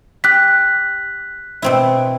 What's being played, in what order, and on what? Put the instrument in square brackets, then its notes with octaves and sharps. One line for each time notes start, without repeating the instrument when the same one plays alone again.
[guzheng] G4 [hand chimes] F#6 B6
[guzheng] B2 C4 E4